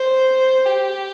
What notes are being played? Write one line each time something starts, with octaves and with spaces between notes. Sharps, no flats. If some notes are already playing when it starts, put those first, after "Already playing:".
Already playing: C5
G4